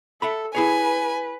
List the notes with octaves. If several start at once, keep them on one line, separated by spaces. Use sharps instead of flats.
A4 E5 F#5 B5
E4 G#4 B4 C#5 G#5